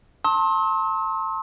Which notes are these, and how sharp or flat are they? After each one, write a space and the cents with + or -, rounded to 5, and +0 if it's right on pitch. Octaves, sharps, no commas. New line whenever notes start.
A5 +25 C6 +35 E6 -45